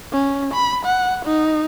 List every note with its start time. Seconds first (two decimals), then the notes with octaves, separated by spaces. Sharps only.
0.12 C#4
0.54 B5
0.85 F#5
1.25 D#4